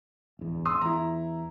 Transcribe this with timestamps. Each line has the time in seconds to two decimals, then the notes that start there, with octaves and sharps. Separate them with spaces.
0.39 D1 E2
0.65 G#1 C6 D#6 E6
0.81 E2 E4 A#5